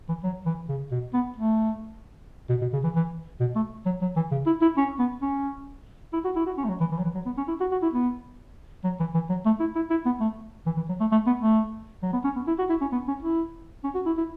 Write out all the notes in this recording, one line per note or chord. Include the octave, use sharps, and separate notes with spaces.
E3
F#3
E3
C#3
B2
B3
A3
B2
B2
C#3
E3
E3
B2
A3
F#3
F#3
E3
C#3
E4
E4
C#4
B3
C#4
E4
F#4
E4
F#4
C#4
A3
F#3
E3
E3
F#3
E3
F#3
B3
C#4
E4
F#4
F#4
E4
B3
F#3
E3
E3
F#3
A3
E4
E4
E4
B3
A3
E3
E3
F#3
A3
A3
B3
A3
F#3
B3
C#4
B3
E4
F#4
E4
C#4
B3
C#4
E4
C#4
F#4
E4
E4